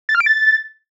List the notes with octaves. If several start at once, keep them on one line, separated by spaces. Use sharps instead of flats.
A6
F6
D7
A6